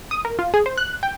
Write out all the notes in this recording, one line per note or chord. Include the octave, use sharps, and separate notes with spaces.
D#6
A#4
F4
G#4
C5
F#6
G5